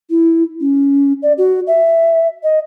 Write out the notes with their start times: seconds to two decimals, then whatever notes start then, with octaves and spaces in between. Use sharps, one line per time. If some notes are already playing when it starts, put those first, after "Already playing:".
0.10 E4
0.61 C#4
1.23 D5
1.38 F#4
1.67 E5
2.44 D#5